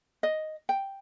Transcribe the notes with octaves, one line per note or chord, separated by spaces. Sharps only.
D#5
G5